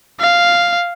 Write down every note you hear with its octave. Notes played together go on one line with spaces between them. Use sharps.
F5